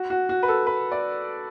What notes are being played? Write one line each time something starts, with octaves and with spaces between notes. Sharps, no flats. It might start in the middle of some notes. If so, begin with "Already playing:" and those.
Already playing: F#4
F#4
F#4
B4
A4
B4
D5